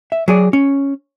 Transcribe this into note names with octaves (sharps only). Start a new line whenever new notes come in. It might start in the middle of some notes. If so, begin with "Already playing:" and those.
E5
F#3 G#4 D5
C#4